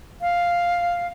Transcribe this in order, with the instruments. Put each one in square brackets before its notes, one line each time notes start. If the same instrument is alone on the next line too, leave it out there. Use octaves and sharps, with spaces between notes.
[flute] F5